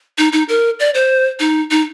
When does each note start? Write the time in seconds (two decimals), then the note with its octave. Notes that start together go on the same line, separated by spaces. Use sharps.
0.18 D#4
0.33 D#4
0.49 A#4
0.80 D5
0.95 C5
1.40 D#4
1.71 D#4